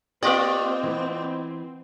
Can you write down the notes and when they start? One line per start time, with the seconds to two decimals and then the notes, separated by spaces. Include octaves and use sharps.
0.23 A#3 C4 F4 G4 D5 D#5
0.83 E3 B3